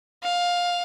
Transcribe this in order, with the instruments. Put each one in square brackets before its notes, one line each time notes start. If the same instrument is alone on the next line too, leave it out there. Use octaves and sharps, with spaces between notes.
[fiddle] F5